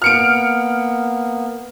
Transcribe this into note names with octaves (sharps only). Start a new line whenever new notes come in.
A#3 B3 F6 C#7 D7